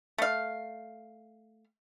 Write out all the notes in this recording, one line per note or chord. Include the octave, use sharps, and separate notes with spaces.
A3 F5